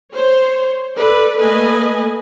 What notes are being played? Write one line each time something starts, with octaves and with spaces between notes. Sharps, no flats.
C5 C#5
A4 B4 D5
A3 A#3 A4 B4 D#5 G#5